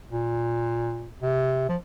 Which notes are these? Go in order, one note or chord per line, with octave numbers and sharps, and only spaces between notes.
A#2
C3
F3